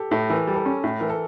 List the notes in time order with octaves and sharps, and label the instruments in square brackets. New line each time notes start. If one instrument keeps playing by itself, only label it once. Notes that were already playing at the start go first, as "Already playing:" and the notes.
Already playing: [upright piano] G4 A4
[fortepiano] A2 [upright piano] A4
[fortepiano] E3 [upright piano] A#4
[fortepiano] G3
[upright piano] A4
[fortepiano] C#4
A2
[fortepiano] E3 [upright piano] A#4
[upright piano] A4